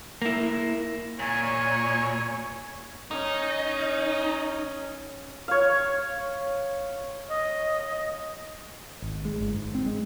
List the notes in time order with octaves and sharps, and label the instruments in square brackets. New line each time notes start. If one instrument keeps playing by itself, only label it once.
[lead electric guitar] A#3 E4
[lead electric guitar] A#2 [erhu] C#5 [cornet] G#5
[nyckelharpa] C#4 [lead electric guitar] D#4
[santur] C#5 F5
[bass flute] D#5
[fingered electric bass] G#1
G#3
G1
G#2
C4
G#3